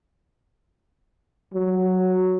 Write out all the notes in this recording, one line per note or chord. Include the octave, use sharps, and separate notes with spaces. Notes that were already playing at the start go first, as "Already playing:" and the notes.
F#3